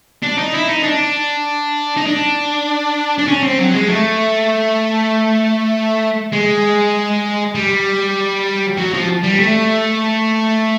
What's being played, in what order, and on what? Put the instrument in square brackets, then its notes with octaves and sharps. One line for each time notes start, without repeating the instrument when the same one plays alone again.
[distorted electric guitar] D4
D#4
E4
D#4
D4
D#4
D4
D4
C#4
C4
F#3
G#3
A3
G#3
G3
F#3
F3
G3
A3